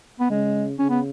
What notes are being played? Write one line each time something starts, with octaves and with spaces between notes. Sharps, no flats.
B3
C#3 G#3
C#3 C#4
B3